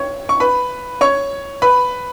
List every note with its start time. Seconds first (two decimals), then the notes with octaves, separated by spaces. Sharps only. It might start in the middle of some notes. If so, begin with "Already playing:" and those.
Already playing: C#5 C#6
0.29 C#6
0.40 B4 B5
1.01 C#5 C#6
1.62 B4 B5